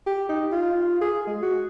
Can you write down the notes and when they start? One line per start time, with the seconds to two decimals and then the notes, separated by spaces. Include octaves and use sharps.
0.06 G4
0.29 D#4
0.52 F4
1.01 G#4
1.27 G#3
1.42 F#4